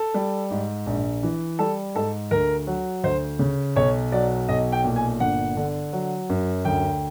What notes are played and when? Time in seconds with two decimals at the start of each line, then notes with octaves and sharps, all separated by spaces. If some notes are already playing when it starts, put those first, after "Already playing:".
Already playing: A4
0.14 G3
0.51 G#2
0.86 A#1
1.23 E3
1.59 G3 A4
1.95 G#2 A4
2.31 D2 A#4
2.67 F#3
3.04 D2 C5
3.39 C#3
3.76 B1 C#5
4.12 F#3 D5
4.49 B1 D#5
4.72 G5
4.84 A#2
4.96 G#5
5.20 G1 F#5
5.57 D3
5.93 F#3
6.29 F#2
6.65 D2 G5